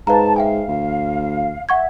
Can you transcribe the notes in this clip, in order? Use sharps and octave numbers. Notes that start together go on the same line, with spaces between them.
G#2 B4 F5 A5 A#5
E5 F5 G5 G#5
D2
E5 F#5 C#6 G#6